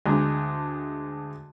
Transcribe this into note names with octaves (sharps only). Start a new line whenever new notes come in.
D2 G#3 D4 G#5 A#5